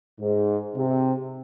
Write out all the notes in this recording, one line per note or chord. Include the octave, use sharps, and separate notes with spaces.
G#2
C3